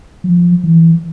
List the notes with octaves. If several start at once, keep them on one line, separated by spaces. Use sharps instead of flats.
F3
E3